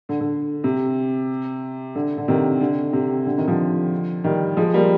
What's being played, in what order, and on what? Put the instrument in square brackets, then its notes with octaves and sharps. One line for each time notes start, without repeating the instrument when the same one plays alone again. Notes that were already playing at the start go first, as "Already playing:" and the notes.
[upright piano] D3
D3
C3
D3
D3
C3 D#3
D3
C3
D3
C3 D#3
D3 F3
D#3 G3
F3 G#3
G3 A#3